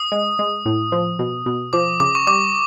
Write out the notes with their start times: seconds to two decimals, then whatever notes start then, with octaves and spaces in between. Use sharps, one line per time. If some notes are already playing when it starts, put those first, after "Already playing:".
Already playing: D#6
0.12 G#3
0.39 G#3
0.66 A2
0.92 F3
1.19 B2
1.46 B2
1.73 F3 D6
2.00 C#3 D6
2.15 C#6
2.27 G3 D6